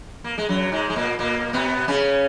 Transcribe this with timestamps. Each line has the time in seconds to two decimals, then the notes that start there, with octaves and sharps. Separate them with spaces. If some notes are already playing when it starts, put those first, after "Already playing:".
0.24 A#3
0.38 G#3
0.49 F#2 F#3
0.72 G#2 G#3
0.90 G#3
0.96 A#2 A#3
1.19 A#2 A#3
1.53 B2 B3
1.88 C#3 C#4